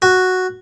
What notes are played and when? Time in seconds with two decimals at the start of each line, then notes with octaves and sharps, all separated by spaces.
0.02 F#4